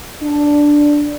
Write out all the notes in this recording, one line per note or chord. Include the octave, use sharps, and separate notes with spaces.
D4